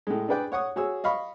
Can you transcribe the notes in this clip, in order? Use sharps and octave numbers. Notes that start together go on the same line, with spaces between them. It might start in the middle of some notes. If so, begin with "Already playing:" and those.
A2 G#3
D4 G#4 B4 D5 G5
C#5 F#5 C#6 D#6
F#4 G#4 C#5 E6
D#5 F5 B5 C#6